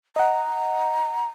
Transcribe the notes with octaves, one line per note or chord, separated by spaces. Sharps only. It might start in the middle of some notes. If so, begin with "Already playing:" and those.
D#5 F#5 A#5